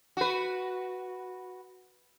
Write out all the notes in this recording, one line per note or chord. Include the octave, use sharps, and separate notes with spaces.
F#4 B4